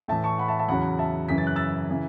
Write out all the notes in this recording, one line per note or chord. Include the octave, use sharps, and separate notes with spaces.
A2 E3 E5 A5
A5 C#6
F#5 B5
E5 A5
E5 A5
E2 C#3 F#3 F#5 B5
E5 A5
F#2 C#3 E3 B6
A6
F#6
E6 A6
C#3 E3